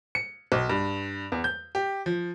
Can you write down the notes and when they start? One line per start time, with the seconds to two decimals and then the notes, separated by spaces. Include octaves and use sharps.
0.15 C#7
0.52 B1
0.70 G2
1.32 E2
1.44 G6
1.75 G4
2.06 F3